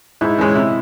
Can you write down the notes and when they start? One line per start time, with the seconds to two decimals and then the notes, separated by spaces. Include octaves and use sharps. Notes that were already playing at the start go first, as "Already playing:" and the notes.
0.21 G#2 E4
0.38 E3 G#3 C#4
0.55 C3 E4